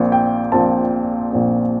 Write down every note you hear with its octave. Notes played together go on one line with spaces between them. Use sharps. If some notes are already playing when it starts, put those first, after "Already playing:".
Already playing: A#1 A#2 F3 C4
G5
A#1 A#2 F3 C4 A5
A#1 A#2 F3 C4